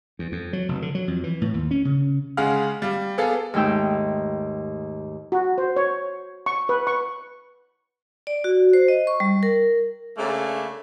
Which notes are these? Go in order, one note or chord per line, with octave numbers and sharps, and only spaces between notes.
E2
F2
F#3
F1
D3
F#3
F2
E3
A2
D#2
C#4
C#3
C#3 G#3 G#4 F5 F#5 F6
G3 F5
B3 G#4 A4 F5
D#2 G#2 A3 D#4 G5 E6
F#4
C5
C#5
C#6
B4
C#6
D5
F#4
C5
D#5
C#6
G3
A#4
C#3 A3 A#3 D4